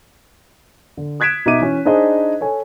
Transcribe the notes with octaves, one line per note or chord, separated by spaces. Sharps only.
D3
D#6 F#6 G#6 B6 D7 E7
B2 D#4 F#4 E5 D6 D#7
E3 C#4
D4 D#4 G#4 C5 D#5
A4 C#5 G#5